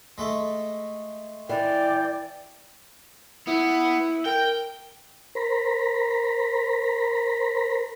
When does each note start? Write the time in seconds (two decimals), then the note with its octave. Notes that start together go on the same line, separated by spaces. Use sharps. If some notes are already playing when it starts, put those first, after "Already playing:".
0.18 G#3 A3
1.49 E3 D5 G5
3.47 B3 E4
4.26 A#4 G5
5.35 A#4 C5 A#5 B5